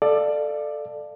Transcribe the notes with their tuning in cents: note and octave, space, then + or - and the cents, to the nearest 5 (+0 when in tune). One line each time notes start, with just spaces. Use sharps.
A4 +0 D5 +20 F5 -25